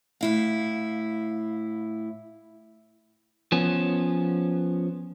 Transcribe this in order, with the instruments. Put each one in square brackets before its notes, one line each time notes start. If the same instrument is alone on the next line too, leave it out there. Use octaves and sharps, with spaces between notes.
[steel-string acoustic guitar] A2 E4 F5
[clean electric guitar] F3 B3 C#4